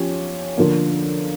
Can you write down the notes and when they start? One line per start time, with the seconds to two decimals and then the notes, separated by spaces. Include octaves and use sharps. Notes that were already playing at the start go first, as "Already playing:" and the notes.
Already playing: F3 C#4 G4 C#5
0.57 D3 F3 A#3